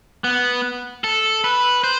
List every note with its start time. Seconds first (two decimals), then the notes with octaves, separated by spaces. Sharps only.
0.24 B3
1.04 A4
1.44 B4
1.84 C5